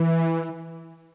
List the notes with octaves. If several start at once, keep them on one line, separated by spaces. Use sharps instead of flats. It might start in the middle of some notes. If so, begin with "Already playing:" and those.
Already playing: E3